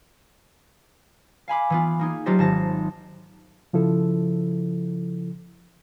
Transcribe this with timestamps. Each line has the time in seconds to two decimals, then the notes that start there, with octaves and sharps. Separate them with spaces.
1.48 F5 G#5 B5 D6
1.70 E3 B3 F4
1.99 A#3 D#4 G#4
2.26 F#3 A3 F4 G4 C5 D#5
2.39 G#1 A5 A#6
3.73 C#3 F3 E4 A4